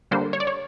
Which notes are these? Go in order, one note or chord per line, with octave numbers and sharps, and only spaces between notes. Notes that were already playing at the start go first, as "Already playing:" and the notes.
D3 G3 A#3 D4 C5
C#5
D5
C#5